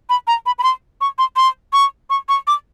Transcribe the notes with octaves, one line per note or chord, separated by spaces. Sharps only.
B5
A#5
B5
B5
C6
C#6
C6
C6
C#6
C#6
C#6
D6